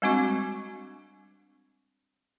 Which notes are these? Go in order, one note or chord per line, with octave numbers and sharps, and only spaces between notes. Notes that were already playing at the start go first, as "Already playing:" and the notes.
G3 G#3 C4 D4 F#4 C#6